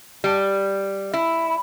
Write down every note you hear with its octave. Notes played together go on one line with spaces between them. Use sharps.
G3
E4